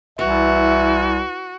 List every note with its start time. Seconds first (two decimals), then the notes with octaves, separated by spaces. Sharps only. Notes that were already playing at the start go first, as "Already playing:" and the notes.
0.19 C2 E3 F#4 E5